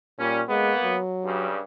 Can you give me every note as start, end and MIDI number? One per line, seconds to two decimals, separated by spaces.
0.19 0.43 46
0.19 0.40 55
0.19 0.40 61
0.49 0.73 56
0.49 0.95 58
0.49 0.95 59
0.82 1.50 54
1.24 1.59 43
1.24 1.59 49
1.24 1.59 55